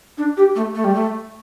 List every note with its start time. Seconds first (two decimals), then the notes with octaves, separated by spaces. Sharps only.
0.18 D4
0.37 G4
0.56 A3
0.75 A3
0.84 G3
0.94 A3